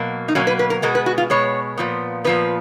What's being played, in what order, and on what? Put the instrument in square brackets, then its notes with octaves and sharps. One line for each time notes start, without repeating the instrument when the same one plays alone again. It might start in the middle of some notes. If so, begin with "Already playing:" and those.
Already playing: [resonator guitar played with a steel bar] B2 F#3 A#3
D#4
B2 F#3 A#3 C#4
B4
B4
A#4
B2 G#3 B3 A#4
B4
F#4
F4
B2 G#3 B3 C#5
A#2 F3 B3
A#2 F3 B3 B4